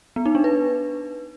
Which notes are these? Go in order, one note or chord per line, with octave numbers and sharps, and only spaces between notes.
B3
D#4
D4
B4